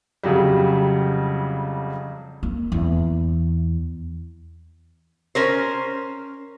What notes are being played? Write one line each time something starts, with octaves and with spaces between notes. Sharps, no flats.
F2 C#3 F#3 G3
A#3
E2
C#4 A#4 C5